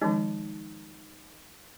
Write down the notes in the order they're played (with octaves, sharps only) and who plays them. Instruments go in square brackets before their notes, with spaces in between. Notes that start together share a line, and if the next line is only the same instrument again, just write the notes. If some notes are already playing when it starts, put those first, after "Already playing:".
[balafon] D#3 F3 G#3 [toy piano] D#4